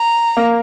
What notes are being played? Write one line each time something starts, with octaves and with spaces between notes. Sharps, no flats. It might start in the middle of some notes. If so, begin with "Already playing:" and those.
Already playing: A#5
A#3